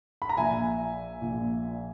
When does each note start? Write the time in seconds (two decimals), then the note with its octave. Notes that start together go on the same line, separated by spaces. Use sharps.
0.22 B5
0.29 A#5
0.37 A#1 A#2 E5 G#5
1.21 A#1 A#2